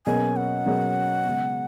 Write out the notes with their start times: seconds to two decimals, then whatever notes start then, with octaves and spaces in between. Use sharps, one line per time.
0.06 B2 F#3 A#3 C#4 G#4 G#5
0.36 F#5
0.66 B2 F#3 A#3 C#4 G#4
1.25 C#3 G#3 B3